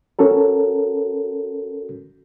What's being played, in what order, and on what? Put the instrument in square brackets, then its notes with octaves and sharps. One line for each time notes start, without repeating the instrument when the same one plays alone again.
[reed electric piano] C#4 F#4 A4 A#4